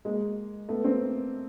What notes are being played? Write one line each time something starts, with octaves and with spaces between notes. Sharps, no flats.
G#3 A#3
A3 B3
A#3 C4